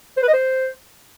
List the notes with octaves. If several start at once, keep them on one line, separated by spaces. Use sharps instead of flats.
C5
B4
D#5
C5